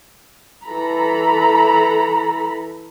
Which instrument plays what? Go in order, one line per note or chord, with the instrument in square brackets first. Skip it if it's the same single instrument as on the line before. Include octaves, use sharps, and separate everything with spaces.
[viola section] E3 A4 A#5 B5